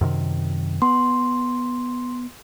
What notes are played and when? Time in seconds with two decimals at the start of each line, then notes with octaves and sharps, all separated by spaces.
0.01 F#2 C3 D#3
0.82 B3 C6